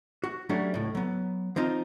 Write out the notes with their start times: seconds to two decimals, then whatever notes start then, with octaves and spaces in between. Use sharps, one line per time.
0.24 F#4
0.49 F#3 G3 A3 C#4 D4
0.74 C#2 A2
0.95 F#3 B3
1.56 F3 C4 D#4 F4